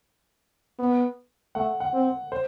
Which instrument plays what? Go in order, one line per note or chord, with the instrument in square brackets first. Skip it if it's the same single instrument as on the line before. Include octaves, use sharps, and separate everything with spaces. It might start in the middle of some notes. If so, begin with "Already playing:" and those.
[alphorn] B3
[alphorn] A3 [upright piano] F#5
[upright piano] F#5
[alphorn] C4
[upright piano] C5